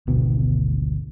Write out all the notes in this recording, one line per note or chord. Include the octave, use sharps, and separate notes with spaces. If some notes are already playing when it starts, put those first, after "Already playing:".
G#1 D2 B2 B3